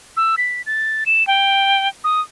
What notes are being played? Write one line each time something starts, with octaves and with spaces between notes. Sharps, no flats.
E6
B6
A6
E7
G5
D#6